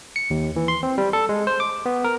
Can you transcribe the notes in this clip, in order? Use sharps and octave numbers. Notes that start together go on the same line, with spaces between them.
C#7
D#2
E3
C6
C4
G3
A4
G#3
C5
D6
B3
A#4